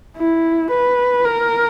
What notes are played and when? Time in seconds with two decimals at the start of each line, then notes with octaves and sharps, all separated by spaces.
0.17 E4
0.71 B4
1.25 A#4